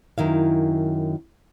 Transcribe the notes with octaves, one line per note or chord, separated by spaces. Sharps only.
F#2 D#3 E4 F5